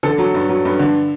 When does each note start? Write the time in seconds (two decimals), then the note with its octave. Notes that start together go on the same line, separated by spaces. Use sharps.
0.03 D3 A4
0.18 F#3
0.34 G2
0.49 F#3
0.65 G2
0.79 D3